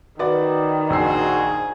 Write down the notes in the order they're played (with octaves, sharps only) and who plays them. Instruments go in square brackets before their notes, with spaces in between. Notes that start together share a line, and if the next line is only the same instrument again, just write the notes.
[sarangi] D#3 [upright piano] F#4 B4 D5
[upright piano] A#1 E6 C7 [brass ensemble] F#4 C5 [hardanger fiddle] G#4